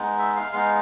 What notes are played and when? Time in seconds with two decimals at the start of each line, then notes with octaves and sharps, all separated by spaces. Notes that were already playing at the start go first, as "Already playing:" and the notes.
Already playing: G#3 B3 D#4
0.18 E5
0.36 F5
0.52 G#3 B3 D#4 F5